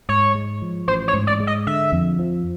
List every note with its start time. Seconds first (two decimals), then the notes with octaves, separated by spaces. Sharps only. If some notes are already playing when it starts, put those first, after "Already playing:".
0.09 G#2 C#5
0.35 G#3
0.62 F3
0.88 A1 C5
1.08 C#5
1.14 G#2
1.27 D5
1.40 G#3
1.47 D#5
1.67 D3 E5
1.92 F2
2.19 F3